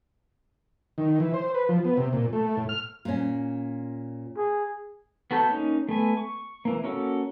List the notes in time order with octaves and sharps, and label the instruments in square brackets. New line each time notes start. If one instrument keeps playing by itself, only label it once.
[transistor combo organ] D#3
E3
C5
B4
F3
B3
C3
A#2
A3
A2
F6
[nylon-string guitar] A#2 C#4
[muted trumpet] G#4
[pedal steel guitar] B3 F#4 A4 A5 G6
A#3 C#4 D#4
A3 B3 G#5
C#6
E3 A#3
A#3 C#4 F#4 A4